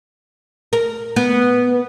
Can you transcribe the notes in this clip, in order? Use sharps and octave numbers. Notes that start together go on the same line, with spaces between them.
A#4
B3